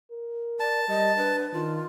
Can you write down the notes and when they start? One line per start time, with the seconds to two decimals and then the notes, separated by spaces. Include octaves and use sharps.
0.11 A#4
0.60 D5 A5
0.89 G3 D#5
1.17 D4 B4
1.53 D#3 F4